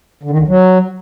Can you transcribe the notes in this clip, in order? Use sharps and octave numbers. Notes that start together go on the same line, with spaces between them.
D3
D#3
D2 D3
F#3